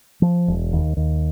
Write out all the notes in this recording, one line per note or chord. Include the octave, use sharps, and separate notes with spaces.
F3
E1
D#2
D#2